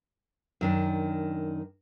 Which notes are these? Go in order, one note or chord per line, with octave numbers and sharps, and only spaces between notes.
F#2 D#3 D4